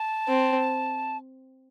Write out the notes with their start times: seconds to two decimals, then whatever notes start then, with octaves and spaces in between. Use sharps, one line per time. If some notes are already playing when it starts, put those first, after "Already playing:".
Already playing: A5
0.28 C4